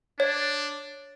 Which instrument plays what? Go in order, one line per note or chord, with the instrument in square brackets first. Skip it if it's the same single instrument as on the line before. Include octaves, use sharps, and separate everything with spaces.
[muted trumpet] D4 [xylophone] C#5